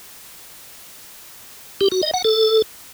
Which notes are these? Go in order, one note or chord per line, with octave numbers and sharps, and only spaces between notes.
G4
F#4
D#5
F#5
A4